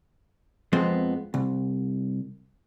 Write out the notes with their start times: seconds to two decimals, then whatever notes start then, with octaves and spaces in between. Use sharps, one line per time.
0.72 F2 F3 G#3 B3 C4 C5
1.34 C2